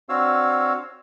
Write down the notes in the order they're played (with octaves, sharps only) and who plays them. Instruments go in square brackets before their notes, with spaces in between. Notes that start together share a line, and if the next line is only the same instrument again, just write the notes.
[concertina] C4 D4 F#4 C#5 F5 E6